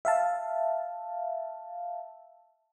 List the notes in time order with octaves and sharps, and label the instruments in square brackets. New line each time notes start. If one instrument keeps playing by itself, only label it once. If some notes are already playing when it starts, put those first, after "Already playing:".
[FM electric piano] E5 F5 A5